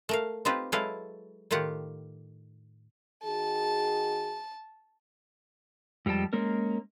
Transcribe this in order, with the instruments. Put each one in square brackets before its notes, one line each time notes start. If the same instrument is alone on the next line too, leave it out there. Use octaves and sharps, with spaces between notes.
[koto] A3 A#4 F5
C4 D#4 F4 G4 B4
F#3 G#3 E4 A4 B4 F5
A2 D#3 F4 G4 F#5
[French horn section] D#3 F#4 G#4 [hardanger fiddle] A5
[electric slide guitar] F2 G3 G#3 G5 A5
G#3 A#3 C#4 A#4